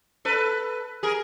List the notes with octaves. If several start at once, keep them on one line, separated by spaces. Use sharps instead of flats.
A4 B4
G#4 A#4